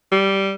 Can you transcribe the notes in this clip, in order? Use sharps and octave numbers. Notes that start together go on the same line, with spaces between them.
G3